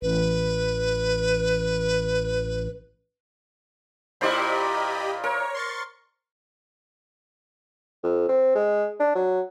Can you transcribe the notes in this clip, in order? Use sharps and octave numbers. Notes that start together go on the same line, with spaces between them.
A1 B4
A#2 E4 G4 C5 D5 D#5 B5
A#4 C#5
C6 C#6 A6
F2
C4
G#3
D4
F#3